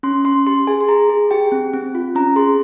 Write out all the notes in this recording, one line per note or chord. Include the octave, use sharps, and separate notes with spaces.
C#4 C6
C#4 C6
G4 C6
G#4 G#5
C6
G#4 A#5
G#4
G4 G5
C4
C4
F4
C#4 A#5
G#4 C6